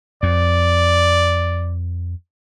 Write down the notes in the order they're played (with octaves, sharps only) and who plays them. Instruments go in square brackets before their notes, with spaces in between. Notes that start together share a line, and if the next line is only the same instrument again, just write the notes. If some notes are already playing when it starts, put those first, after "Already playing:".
[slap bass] F2 [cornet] D5